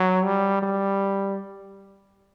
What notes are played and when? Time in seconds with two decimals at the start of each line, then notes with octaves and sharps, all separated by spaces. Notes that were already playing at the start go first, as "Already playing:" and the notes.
Already playing: F#3
0.25 G3
0.62 G3